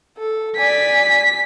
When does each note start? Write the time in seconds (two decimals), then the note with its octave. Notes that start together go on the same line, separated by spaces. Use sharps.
0.18 A4
0.57 D5 G#5 B6